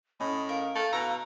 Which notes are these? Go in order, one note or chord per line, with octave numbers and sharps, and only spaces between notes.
A2 C#4 D#5 B5
A#4 F5
A3
B2 A#5 E6 F7